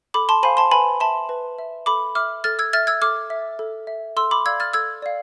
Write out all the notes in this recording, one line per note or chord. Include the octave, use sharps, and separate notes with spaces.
A4 B5 D6
A5 C6
C5 F5 G#5 B5
A5 C6
B4 G#5 B5
E5 A5 C6
B4
E5
A4 B5 D6
E5 D6 F6
A4 F6 A6
E6 G#6
E5 F6 A6
E6 G#6
A4 D6 F6
E5
A4
E5
A4 C6 E6
B5 D6
D5 F5 E6 G#6
F6 A6
A4 E6 G#6
D5 F5